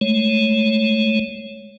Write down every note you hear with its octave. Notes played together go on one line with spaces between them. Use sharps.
G#3 A3 C#5